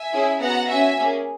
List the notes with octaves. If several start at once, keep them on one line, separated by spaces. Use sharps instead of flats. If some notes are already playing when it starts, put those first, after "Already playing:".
Already playing: E5 G#5
C#4 E4 G#4
B3 F#4 F#5 A#5
C#4 F#4 E5 G#5
A#3 C#4 G#4